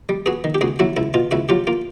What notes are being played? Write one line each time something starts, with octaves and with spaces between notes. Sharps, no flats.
G3
B3 F#4 G#4
D#3
G4
C#2 F#4 G#4
F#3 E4 F#4
C#2 E4
B2 F4
C#2 E4 F#4
F#3 F4 G4
A#3 F4